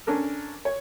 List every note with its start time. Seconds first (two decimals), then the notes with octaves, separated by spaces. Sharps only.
0.07 C#4 D4 A4 A#4
0.65 C#5